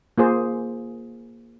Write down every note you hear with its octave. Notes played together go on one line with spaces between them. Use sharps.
A#3 F4 G#4 C5